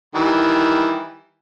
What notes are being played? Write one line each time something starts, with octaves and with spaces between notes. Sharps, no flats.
D#3 E3 G3